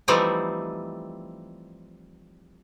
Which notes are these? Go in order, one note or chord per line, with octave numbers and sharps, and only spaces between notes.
E3 F3 G3 A3 C4 D#4